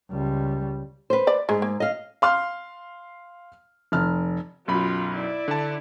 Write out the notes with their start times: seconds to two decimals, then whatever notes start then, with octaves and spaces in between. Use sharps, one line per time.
0.10 C#2 G3
1.10 B4 C5
1.27 D5
1.49 G#2 G#3
1.62 A#3
1.80 D#5 F5
2.22 F5 C6 F6
3.92 F1 F6
4.68 B1 F#2 F4 B5
5.15 E4 D5
5.48 D3 A5